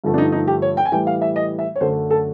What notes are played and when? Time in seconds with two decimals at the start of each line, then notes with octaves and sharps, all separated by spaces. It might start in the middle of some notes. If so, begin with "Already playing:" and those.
0.04 G2 D3 F3 A3
0.14 D4
0.18 D#4
0.32 D#4
0.47 G4
0.62 C#5
0.77 G5
0.85 G#5
0.92 A2 E3 G3 G5
1.07 F5
1.22 E5
1.36 D#5
1.59 E5
1.76 C#5
1.81 F#2 D3 F#3 A3 C5
2.10 A4